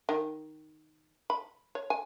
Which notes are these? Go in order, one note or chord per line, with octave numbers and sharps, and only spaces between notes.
D#3
B5
C#5
G#5